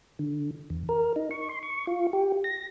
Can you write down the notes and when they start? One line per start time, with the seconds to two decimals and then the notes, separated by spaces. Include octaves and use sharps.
0.19 D3
0.70 E2
0.89 A#4
1.16 D#4
1.31 C#6
1.49 C6
1.63 C#6
1.87 F4
2.13 G4
2.44 A#6